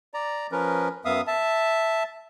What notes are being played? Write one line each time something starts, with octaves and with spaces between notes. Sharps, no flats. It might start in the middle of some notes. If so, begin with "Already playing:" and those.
D5 A#5
F3 C#4 A#4 B4
F#2 B3 E5 F5 D#6
E5 A5